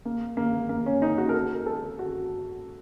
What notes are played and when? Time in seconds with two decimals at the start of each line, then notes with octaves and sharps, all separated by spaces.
0.05 A#3
0.37 A#3
0.69 A#3
0.86 C#4
1.02 D#4
1.18 F#4
1.29 A#4
1.34 A4
1.66 A4
1.99 F#4